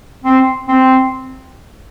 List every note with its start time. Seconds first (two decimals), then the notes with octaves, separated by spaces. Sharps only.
0.24 C4
0.68 C4